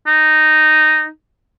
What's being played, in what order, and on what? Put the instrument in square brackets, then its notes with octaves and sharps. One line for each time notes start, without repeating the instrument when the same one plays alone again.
[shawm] D#4